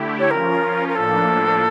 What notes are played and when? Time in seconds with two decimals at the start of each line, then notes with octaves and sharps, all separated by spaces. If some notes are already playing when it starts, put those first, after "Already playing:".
Already playing: D3 A3 E4 G4
0.19 C#5
0.30 F3 C#4 F4 A#4
0.88 A#4
0.95 A2 F3 A#3 D4 A4